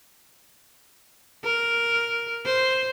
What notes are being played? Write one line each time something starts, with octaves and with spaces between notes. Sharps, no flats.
A#4
C5